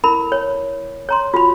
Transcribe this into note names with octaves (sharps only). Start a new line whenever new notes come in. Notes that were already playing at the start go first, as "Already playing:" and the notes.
E4 A#4 B5
C#5
C#5 A#5 C6
F4 F#4 B5